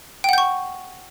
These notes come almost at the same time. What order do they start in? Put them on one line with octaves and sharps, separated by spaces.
G5 F#5 G6 C#6